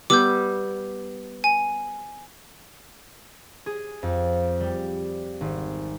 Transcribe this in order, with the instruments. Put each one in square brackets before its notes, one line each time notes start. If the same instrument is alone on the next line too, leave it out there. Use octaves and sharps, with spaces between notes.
[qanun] G3 B3 [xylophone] D6 E6 G6
[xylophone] G#5
[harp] G#4
F2
G3
G#1